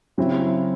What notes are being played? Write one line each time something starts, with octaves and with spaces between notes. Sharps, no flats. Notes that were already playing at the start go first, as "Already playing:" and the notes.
C#3 F#3 C4 E4